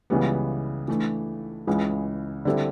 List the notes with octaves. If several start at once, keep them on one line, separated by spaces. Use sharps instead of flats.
C#2 C#3 E3 G3 B3
E3 A3 D4
C#2 C#3 E3 G#3
D3 G3 C4 E4 A4